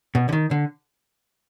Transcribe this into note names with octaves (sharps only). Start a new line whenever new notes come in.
B2
D3
D#3
D3